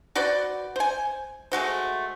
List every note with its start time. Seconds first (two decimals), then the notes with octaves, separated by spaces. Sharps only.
0.15 F#4 B4 C5 D5
0.76 C5 G#5
1.52 G#3 A3 F#4 C5